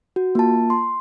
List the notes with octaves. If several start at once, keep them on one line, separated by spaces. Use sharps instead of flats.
F#4
A#3 F4 A5
C6